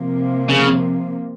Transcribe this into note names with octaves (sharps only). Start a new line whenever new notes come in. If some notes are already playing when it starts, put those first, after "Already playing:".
Already playing: C3 F3 A#3
C#3